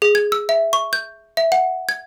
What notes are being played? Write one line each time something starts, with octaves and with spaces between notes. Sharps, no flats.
G#4
G#6
E6
E5
C#6
G6
E5
F#5
G#6